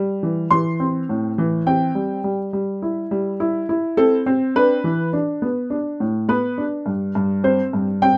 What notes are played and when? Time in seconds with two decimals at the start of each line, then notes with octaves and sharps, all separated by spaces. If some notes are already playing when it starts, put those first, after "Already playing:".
Already playing: G3
0.23 E3
0.51 E3 C6
0.80 C4
1.09 A2
1.38 E3
1.66 C4 G5
1.95 G3
2.24 G3
2.53 G3
2.82 E4
3.11 G3
3.40 E4
3.69 E4
3.97 C4 A4
4.26 C4
4.56 D4 B4
4.84 E3
5.13 D4
5.42 B3
5.70 D4
6.00 A2
6.28 B3 B4
6.58 D4
6.86 G2
7.15 G2
7.44 C4 C5
7.73 G2
8.02 C4 G5